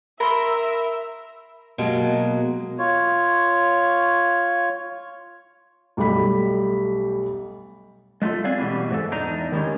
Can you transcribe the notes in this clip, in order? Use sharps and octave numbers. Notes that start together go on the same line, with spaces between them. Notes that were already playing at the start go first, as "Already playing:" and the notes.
A#4 E5 B5 C6 D#6
B2 F#3 G#3 A#3
F4 C#5
B1 G3 A3 G4 B5 B6
G#3 A3 C#4 F4 A4
C4 D4 G#4 D5 F5
B2 E3 G3
G#2 E3 A4
E2 D4 D#4 A#5
D#3 G3 G#3 C#4